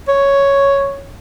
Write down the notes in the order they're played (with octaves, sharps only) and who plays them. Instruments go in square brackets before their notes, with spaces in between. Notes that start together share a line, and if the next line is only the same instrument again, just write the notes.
[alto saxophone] C#5